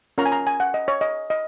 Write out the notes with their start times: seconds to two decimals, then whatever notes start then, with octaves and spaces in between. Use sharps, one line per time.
0.18 C#4 F4 A#4 C#5 A#5
0.26 G#5
0.32 A#5
0.47 G#5
0.60 F#5
0.74 D#5
0.88 C#5
1.01 D#5
1.30 D#5